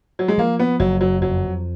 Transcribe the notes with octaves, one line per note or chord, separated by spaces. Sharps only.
F#3
G#3
F3 A#3
B3
F#1 F#3
F#3
F2 F#3